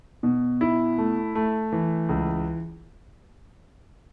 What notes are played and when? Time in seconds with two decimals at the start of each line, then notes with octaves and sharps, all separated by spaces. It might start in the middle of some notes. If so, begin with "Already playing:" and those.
0.23 B2
0.61 E4
0.98 A3
1.35 A3
1.72 E3
2.09 C#2